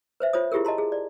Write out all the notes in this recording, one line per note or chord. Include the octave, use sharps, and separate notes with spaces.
B4 C5 E5
F4 C5 C#5 D#6
E4 F4 G4 G#4 A#4
D#5 A5 A#5 C6
G#4
D5